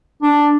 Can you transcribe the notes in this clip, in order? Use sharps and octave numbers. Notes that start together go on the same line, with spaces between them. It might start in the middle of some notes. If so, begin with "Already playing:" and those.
D4